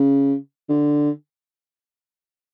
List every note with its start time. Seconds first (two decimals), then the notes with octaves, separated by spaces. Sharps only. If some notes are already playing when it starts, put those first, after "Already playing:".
Already playing: C#3
0.69 D3